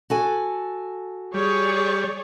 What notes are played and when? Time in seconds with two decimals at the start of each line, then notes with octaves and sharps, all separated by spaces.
0.10 F#4 A4 G#5
1.34 G3 G#4 C#5 D5